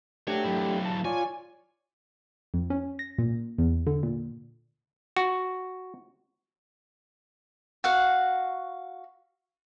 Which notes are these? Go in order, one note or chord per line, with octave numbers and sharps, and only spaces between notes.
A3 D4 G4 C#5 F#5
F#3 E4
A5
F4 C#5 D5 G#5
F2
C#4
A#6
A#2
E2
D3
A#2
F#4
F#4 F5 F#5